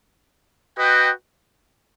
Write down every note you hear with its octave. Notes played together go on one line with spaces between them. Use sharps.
F#4 B4 D#5 G5